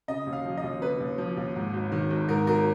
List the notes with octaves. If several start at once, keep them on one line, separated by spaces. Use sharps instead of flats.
C#3 D#5
D#2
F5
F3
D#5
D#2
C#3 B4
D#2
F3
D#2
G#2
G#1
D#3
G#1
G#2 A#4
G#1 A#4